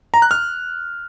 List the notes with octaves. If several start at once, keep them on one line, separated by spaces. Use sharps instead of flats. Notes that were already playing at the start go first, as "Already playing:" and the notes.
A#5
F#6
F6